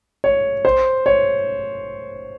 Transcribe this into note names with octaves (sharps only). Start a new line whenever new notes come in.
C#5
C5
C#5